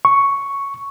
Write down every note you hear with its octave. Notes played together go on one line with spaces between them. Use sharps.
C#6